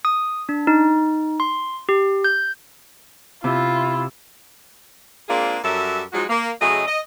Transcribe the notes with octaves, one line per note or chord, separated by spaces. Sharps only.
D#6
D4
D#4
C6
G4
G6
C3 E4 F4
G#3 A#3 C4 D4 F4 G#4
F#2 F#3 G3 A4 A#4 E5
F3 F#3 G#3 D#4 F#4
A#3
C#3 F#3 A3 G#4 D#5
D#5